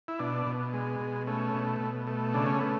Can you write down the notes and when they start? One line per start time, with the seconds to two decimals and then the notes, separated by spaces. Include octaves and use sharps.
0.08 E4
0.19 B2 D4
0.47 B2
0.73 G#3
1.00 B2
1.27 A3 C#4
1.54 B2
1.80 B2
2.07 A3
2.34 C#3 D4
2.47 C#4
2.59 A3 B3